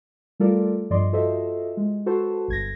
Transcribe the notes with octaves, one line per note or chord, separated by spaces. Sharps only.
G3 A3 F4 A4 A#4 D5
G2 F3 D5 D#5 C6
F4 F#4 A4 C5 D#5 E5
G#3
F#4 A4 B4 C5 A5
G1 G#6 A#6